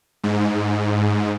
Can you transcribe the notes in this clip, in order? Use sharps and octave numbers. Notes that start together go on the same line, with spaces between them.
G#2